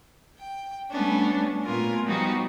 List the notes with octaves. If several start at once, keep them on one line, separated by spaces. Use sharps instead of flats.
G5
G3 A3 B3 C#4 D4
A#2 A3 B3 F4 A#4 G#5
F3 G3 B3 D#4 F#4 G4